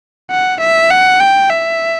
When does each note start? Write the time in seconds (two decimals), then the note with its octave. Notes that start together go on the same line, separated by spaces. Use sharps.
0.30 F#5
0.61 E5
0.90 F#5
1.20 G5
1.50 E5